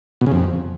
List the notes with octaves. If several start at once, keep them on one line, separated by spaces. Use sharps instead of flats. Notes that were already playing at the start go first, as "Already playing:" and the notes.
B2
C#3
F2